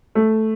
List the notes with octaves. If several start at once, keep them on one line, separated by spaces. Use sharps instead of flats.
A3